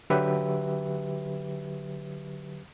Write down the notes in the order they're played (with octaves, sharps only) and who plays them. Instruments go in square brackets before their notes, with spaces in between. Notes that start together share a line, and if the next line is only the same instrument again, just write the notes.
[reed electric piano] D3 F#3 G4 B4 E5